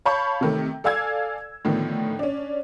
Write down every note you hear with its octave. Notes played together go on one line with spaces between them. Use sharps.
C#5 F5 A5 B5 C#6 G6
C3 D#3 A3
A4 D5 F5 G#5 E6 G#6
A2 D3 D#3 F3 B3
C#4 D4